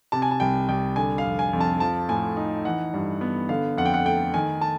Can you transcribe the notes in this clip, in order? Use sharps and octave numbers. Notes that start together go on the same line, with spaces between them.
C3 A5
G#5
A5
C2 G5
C2 G5
D3 G#5
F5
F2
G#5
F2
A5
F3 A5
A2 G#5
D#4
E3 F#5
G2
B3
D3 F5
F2 F#5
G5
F#5
A3 G5
D#3 G#5
A5